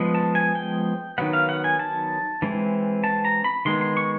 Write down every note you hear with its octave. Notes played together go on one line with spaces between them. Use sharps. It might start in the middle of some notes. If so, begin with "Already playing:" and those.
Already playing: F3 G#3 B3
A5
G#5
G5
D#3 F#3 B3 F#5
F5
F#5
G#5
A5
E3 G#3 C4
A5
A#5
B5
D#3 G#3 B3 C6
C6
C#6